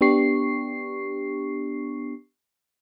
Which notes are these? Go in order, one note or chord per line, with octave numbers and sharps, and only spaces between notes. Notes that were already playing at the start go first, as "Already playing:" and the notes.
B3 D4 G4 C#6 C7